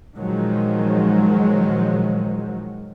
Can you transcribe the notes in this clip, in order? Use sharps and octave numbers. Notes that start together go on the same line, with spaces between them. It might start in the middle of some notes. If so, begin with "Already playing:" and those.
A#2 D#3 F3 F#3 G#3